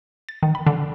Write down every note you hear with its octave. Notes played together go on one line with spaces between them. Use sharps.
A6
D#3
B5
D3